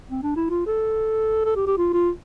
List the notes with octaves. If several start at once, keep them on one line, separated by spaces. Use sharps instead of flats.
C4
D4
E4
F4
A4
A4
G4
G4
F4
F4